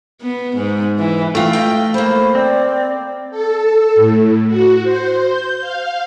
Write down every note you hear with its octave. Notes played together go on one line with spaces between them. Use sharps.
B3
G#2
E3
E3 A3 F4 G5
D#5 F5 G5
A#3 C5 B5
C4 D5
A4
A2
F#4
C5
G6
F5